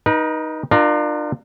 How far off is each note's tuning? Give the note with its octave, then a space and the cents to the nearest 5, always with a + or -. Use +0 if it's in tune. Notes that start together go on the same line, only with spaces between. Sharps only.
D#4 +0 B4 -40
D4 +35 F4 +0 A#4 +0